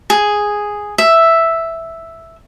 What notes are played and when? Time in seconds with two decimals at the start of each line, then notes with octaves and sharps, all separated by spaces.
0.10 G#4
0.98 E5